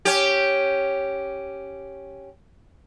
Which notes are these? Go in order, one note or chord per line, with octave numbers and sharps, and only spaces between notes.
C#4 G4